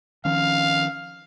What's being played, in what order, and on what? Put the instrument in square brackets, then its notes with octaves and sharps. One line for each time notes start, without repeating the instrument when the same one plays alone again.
[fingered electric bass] D#3 F3 C#4 [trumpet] F5